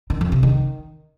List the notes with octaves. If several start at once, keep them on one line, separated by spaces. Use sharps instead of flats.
D#3
F2
C3
D#3